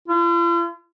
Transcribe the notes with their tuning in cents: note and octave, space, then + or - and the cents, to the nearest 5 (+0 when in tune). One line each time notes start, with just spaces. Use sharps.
F4 -45